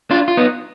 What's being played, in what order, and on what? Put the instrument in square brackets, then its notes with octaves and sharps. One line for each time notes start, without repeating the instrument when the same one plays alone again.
[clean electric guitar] D4 F4
F4
B3 D#4